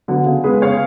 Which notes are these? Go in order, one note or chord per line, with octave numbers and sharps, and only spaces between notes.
D3 F#3 B3
C#3
G#3 B3 G#4 B4
C#3 C#5 F5